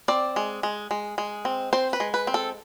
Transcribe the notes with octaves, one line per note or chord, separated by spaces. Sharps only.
C4 D5
G#3
G#3
G#3
G#3
C4
C4 C5
B4
G#3
B4
C4
A4